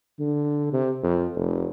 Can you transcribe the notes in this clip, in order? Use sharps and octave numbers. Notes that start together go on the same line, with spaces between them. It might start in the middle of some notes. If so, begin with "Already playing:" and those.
D3
C3
F2
F1